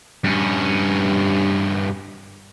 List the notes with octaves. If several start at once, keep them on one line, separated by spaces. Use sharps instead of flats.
G2 C#4